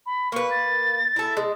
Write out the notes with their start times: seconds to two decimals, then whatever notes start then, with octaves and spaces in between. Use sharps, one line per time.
0.06 B5
0.32 A#3 B4 C#6
0.51 A6
1.16 E4 A4
1.37 G#3